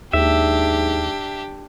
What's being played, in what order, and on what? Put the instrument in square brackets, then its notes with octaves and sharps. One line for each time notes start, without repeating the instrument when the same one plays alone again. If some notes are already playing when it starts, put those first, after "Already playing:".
[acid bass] D#2 [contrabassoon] G#2 [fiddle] D4 G4 [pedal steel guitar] E5